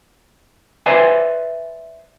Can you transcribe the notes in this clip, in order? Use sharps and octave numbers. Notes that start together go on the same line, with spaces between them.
B4 C5 D5 E5 G#5